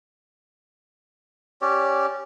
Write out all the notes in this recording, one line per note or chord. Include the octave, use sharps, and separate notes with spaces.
C#4 G4 C#5 D5